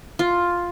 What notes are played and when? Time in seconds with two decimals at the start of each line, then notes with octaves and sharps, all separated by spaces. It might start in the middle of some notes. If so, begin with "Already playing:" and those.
0.19 F4